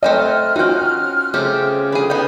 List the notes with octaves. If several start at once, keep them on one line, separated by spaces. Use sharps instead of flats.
A3 C4 A#4 D#5 G5 F6 F#6
C#4 D#4 F4 F#4 G5
C#3 A3 C4 G4
D3 G#4 B4
B3 D#4 G5